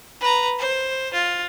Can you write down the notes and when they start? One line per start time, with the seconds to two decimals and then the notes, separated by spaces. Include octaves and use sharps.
0.20 B4 A#5
0.59 C5
1.13 F4